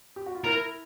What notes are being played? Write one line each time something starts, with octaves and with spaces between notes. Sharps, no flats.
G4
F#4
F4
E4 A#4